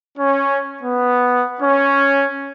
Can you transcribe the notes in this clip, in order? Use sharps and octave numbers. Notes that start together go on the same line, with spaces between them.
C#4
B3
C#4